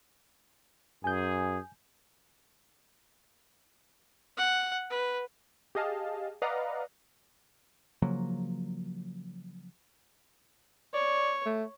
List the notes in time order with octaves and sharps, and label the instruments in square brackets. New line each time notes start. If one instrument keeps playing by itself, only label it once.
[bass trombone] F#2 [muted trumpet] G#4 [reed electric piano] G#5 G6
[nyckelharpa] F#5
B4
[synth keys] G4 G#4 D#5 F5 A5
B4 D5 D#5 F5 F#5 A#5
[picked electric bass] C#3 F3 F#3 A#3
[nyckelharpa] C#5 [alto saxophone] D5
[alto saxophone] A3